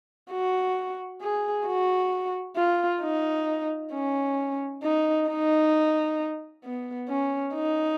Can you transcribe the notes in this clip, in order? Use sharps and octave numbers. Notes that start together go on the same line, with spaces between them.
F#4
G#4
F#4
F4
D#4
C#4
D#4
D#4
B3
C#4
D#4